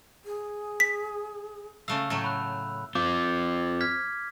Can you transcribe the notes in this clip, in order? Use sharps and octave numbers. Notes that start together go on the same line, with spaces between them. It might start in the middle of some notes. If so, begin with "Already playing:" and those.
G#4
B6
C#3 A3 F5 E6
A2 F#3 A3
B5 F#6
C4 F4 D6
F6 G#6 B6